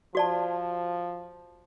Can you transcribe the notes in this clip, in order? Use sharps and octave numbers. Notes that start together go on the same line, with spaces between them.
F3 F#4 D5 A5